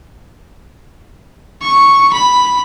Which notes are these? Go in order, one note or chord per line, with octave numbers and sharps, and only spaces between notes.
C#6
B5